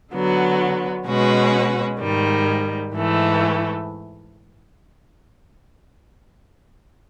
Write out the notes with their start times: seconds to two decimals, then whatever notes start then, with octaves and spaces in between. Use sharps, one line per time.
0.14 D3 F#3 B3
1.07 B2 G#3 C#4 F#4 B4
2.00 G#2 D#3 G3
2.94 G#2 E3 A3